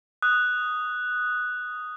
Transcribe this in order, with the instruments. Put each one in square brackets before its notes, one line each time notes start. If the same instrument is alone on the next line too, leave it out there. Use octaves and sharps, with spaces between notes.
[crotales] D#6 F#6